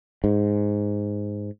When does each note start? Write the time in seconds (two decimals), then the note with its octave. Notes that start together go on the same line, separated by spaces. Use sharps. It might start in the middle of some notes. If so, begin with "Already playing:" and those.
0.24 G#2